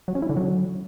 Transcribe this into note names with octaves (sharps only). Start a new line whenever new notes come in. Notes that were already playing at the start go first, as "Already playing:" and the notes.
F#3
C#4
E4
D3
F#3